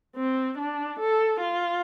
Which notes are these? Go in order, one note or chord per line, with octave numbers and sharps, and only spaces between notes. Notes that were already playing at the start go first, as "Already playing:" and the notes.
C4
D4
A4
F4